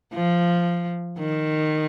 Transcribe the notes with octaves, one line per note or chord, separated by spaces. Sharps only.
F3
D#3